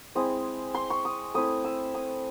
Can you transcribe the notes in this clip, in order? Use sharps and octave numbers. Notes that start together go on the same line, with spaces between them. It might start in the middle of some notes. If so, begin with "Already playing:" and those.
G#3 C4 E4 D#6
C6
C#6
D#6
A3 C4 E4 D#6
E6
D#6